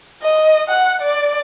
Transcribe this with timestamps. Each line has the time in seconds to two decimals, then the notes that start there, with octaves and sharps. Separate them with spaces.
0.22 D#5
0.68 F#5
1.01 D5